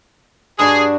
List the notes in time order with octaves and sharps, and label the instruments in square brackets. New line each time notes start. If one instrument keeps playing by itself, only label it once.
[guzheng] G2 D4 F#4 [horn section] G#4